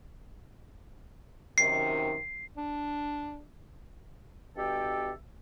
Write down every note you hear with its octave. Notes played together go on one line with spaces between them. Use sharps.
F#2 C3 D#3 C7
D4
G2 B2 G4 A4 E5 G5